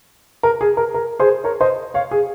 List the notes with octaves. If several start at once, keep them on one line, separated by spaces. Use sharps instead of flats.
A#4
G#4
A#4
A#4
G#4 C5
A#4 C#5
C5 D#5
C#5 F5
G#4